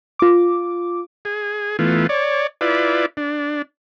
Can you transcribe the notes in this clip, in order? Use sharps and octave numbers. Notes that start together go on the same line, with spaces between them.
F4 D6
G#4
E3 A3 B3 F4
C#5 D5
E4 F4 B4 D5
D4